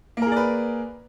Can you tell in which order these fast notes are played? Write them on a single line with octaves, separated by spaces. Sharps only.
A#3 A#4 G#4 D5 B4